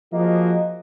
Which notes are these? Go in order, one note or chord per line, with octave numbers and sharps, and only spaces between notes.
F3 A#3 F#4 G#4 D#5